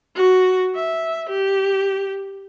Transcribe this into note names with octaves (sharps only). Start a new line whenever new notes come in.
F#4
E5
G4